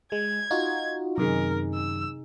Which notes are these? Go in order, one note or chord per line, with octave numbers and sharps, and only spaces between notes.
G#3 G#6
D#4 F4 F#4
F#2 C3 D#3 D#4 G#4 A#4
E6